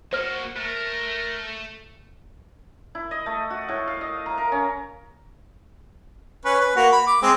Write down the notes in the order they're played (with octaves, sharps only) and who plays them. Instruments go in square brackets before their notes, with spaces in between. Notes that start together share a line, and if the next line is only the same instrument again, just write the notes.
[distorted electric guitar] A#3 F#4 [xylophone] C5 F6
[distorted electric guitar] A3 [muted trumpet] A#4
[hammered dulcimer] E4
D#5
A3
F#4
A2
F5
D#5
A#5
A#4
C#4
[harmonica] C#4 B4
B4
A#3 F#4
B5
D6
G#3 C4